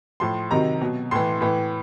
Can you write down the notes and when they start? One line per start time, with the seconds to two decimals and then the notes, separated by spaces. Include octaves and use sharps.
0.20 A2 F3 C6
0.51 C3 D#3 F#3 A#5
0.81 B2 F#3
1.11 A2 E3 C6
1.41 A2 E3